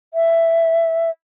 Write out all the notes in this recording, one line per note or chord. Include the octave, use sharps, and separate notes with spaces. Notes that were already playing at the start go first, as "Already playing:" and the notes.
E5